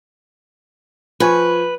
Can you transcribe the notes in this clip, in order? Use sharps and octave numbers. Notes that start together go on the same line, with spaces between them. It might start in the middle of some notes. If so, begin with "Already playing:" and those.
F3 B4 G#5 C#6